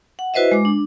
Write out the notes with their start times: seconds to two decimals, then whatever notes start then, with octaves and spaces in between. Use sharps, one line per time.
0.19 F#5
0.34 E4 F#4 B4 C5 D#5 E5
0.51 G#3 D6
0.65 D4